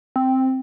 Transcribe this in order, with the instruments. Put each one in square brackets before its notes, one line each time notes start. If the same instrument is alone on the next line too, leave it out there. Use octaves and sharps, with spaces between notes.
[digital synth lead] C4